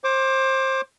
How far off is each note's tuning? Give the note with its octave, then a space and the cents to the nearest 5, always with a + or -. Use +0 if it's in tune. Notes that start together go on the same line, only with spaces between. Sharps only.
C5 +25 D6 +0